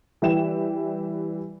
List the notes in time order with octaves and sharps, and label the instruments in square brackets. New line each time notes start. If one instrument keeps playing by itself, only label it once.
[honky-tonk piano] E3 G3 E5 G5 E7